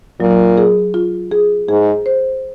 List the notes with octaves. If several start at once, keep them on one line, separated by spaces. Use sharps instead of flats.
A#2 F#3
G#4
F4
G#4
G#2 G#4
C5